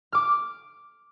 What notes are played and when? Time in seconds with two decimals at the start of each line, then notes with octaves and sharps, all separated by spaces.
0.12 D6 F6